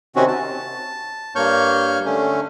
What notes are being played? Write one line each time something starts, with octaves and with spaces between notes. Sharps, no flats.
C3 D#3 C4 C#4 F#4
A5
G2 A#3 C#5 C#6 F6 G6
D3 A3 C#4